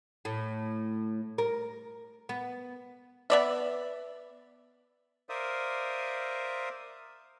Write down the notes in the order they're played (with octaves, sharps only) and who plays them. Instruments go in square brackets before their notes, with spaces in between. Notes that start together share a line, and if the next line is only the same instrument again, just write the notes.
[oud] A2
A#4
B3
[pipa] B3 D5 E5
[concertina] A#4 C5 D5 E5 F5 D#6